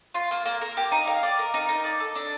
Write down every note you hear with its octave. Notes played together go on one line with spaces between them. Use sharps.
F4
A#3
A#3
A#4
G4
D#4
F5
D5
A#4
D#4
D#4
D5
A4
D4